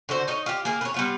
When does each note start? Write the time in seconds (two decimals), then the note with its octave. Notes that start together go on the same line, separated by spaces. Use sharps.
0.09 D3 F#4 C5
0.28 D#4 C#5 D#5
0.46 F4 G4
0.65 A#3 G#4 A#4
0.81 B4 C#5
0.94 G3 B3 F4